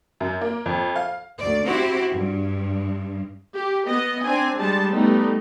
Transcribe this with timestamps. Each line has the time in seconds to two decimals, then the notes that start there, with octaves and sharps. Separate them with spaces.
0.20 F#2
0.41 A#3
0.66 F2
0.96 F5
1.37 D2 D5
1.66 C4 E4 F#4 G4
2.12 G2
3.55 G4
3.88 B3 D#5
4.24 C4 D4 G#5
4.60 G3 G#3 A5
4.94 G3 A3 B3 D#4